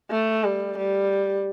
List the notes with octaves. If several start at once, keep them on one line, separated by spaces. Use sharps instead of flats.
A3
G3
G3